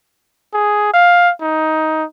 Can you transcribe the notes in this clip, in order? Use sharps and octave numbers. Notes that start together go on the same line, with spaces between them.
G#4
F5
D#4